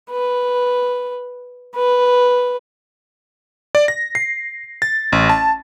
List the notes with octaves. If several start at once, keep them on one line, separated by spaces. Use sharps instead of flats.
B4
B4
D5
A#6
C7
A6
A1
A5